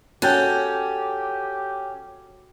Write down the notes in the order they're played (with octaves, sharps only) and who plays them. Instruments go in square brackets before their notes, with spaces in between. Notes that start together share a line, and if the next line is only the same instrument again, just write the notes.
[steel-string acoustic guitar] C#4 [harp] F#4 A4 G5 [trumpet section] G4